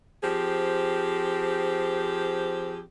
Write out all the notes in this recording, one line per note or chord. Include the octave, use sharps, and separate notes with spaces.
F3 C4 G4 G#4